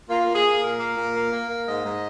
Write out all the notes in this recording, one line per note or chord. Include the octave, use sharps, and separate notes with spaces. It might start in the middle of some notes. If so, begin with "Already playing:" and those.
A#3 F4
A#3
G#4
A#3
A#2 A#4
A#3
A#2
A#3
A#3
A#3
G#2 D#5
G#2